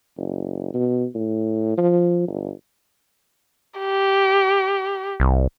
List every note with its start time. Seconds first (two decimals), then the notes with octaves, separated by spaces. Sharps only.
0.17 F#1
0.74 B2
1.15 A2
1.78 F3
2.28 G1
3.79 G4
5.20 C2